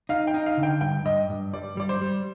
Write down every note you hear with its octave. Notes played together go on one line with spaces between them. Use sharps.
D#4 F5
G5
D#4
F5
D3
G5
G2 G5
G2 D#5
G2
G3 D5
G3 D5
C5
G3